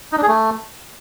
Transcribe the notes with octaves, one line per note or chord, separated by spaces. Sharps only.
D#4
D4
G#4
A3